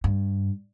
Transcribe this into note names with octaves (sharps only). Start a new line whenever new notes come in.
G2